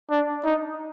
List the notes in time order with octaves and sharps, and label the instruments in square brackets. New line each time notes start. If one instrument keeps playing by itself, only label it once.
[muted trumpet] D4
D#4